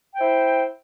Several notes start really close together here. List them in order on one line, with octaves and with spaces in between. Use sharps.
G5 C5 E4